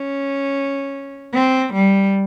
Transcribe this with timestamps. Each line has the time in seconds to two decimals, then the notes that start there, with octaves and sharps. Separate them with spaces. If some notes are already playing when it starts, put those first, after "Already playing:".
Already playing: C#4
1.34 C4
1.73 G3